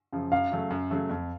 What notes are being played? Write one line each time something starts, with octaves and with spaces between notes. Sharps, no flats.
F#2 C#3 F3
F#2 F5
C#3 F#3 A3
F#2
C#3 F#3 A3
F2